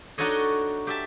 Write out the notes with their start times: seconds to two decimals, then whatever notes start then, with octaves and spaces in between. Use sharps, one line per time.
0.18 D4 D#4 F#4 A4 C#5 D#5
0.87 G4 E5 A5